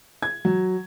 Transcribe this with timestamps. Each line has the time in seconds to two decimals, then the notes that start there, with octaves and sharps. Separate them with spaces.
0.22 G#6
0.45 F#3